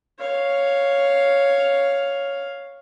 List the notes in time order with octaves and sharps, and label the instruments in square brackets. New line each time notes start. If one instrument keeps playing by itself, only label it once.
[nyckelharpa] C#5 F5